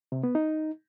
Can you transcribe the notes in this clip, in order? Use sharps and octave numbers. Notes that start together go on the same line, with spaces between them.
C3
B3
D#4